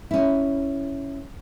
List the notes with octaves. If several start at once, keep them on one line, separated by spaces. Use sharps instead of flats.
C#4 E4